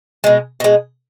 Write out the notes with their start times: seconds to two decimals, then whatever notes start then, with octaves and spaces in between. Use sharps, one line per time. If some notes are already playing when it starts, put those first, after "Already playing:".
0.24 B2 G#3
0.60 B2 G#3